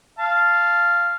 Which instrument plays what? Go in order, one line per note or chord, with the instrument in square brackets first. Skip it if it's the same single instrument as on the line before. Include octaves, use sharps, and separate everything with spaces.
[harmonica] F5 A5